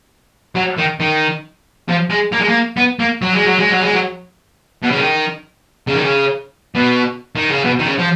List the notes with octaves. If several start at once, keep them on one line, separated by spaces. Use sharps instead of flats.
F#3
D#3
D#3
F3
G#3
A#3
G#3
A#3
B3
A#3
F#3
G#3
F#3
G#3
F#3
G#3
F#3
B2
C#3
D#3
C#3
D#3
C#3
B2
D#3
C#3
B2
D#3
C#3
F3